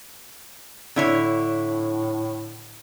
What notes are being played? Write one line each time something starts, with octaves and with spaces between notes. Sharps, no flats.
A2 D3 E4 C#5